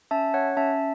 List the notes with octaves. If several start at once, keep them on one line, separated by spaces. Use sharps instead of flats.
C#4 E5 A5
C#5 F#5
C#4 E5 A5